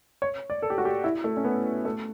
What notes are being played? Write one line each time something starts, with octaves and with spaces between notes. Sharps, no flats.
C#5
D5
A4
G4
F#4
G4
E4
A3
C#4
B3
A3